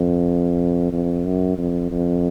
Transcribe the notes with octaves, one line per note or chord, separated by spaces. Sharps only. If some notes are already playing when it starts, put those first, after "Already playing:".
Already playing: F2
F2
F#2
F2
F2